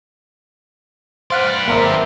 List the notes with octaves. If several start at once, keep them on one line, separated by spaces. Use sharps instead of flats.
B4 C5 D5 F5 F#5
G#1 A#3 C4 E5 A#5